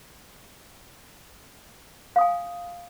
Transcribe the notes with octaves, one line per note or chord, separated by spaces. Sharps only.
F5 G#5 D#6